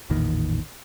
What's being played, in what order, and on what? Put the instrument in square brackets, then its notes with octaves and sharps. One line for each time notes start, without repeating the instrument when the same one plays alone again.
[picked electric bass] A1 E2 A#2 D#3